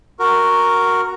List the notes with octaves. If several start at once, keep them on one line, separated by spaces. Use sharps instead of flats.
F#4 A#4